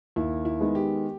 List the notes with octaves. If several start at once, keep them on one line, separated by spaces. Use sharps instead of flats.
D#2 E4
E4
D#3 G#3 B3
G4